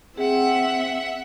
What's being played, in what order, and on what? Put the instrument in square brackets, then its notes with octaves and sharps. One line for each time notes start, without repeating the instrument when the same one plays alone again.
[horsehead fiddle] C4 [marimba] G#4 [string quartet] E5 F#5